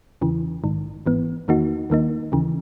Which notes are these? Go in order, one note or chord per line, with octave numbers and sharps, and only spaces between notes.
E2 C#3 E3
A#1 G#2 D#3
G#1 G#2 E3 B3
E2 D#3 A#3 D#4 F#4
D#2 D#3 A#3 D#4
D#2 C#3 E3